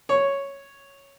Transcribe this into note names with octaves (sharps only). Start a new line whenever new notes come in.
C#5